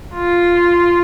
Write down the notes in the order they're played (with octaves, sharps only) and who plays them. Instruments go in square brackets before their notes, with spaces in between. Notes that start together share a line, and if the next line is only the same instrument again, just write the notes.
[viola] F4